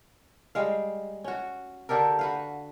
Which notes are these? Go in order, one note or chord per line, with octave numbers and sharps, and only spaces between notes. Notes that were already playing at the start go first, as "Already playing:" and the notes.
G3 G#3 F5
C#4 F#4
D3 G4 A4 A#4
F#4 B4 F5